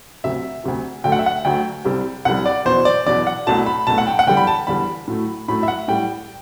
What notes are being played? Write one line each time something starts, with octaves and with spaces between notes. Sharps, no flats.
D2 C3 F#3 E5
D2 C3 F#3
D2 D3 F#3 A3 G5
F#5
E5
F#5
D2 D3 F#3 A3 G5
C2 C3 G3
C2 C3 G3 F#5
D5
E2 B2 F#3 C5
D5
E2 B2 F#3 D5
F#5
C2 B2 F#3 A3 A5
B5
C2 B2 F#3 A3 A5
F#5
G5
F#5
E2 D3 G3 G5
B5
A5
E2 D3 G3 B5
A2 F#3 A3
A2 F#3 A3 B5
E5
F#5
A2 G3 G5